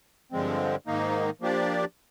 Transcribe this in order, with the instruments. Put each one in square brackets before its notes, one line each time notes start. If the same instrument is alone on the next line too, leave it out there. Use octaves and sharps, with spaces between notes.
[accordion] G2 D3 F3 G#3 C4
G#2 D#3 A#3 D#4
F3 A#3 D4 G4 D5